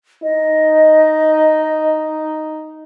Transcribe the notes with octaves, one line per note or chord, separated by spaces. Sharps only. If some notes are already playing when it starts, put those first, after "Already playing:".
D#4 D#5